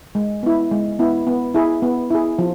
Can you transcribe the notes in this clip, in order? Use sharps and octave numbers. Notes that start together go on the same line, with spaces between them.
G#3
B3 E4
G#3
B3 E4
B3
E4 G#4
B3
E4 G#4
F3